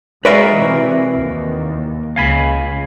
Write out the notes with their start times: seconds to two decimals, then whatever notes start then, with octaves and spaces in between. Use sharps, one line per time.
0.25 G#3 F#4 A#4 B4 D5 E5 F5
0.57 C3 E3
1.17 D#2
2.16 C#2 F5 G#5 B5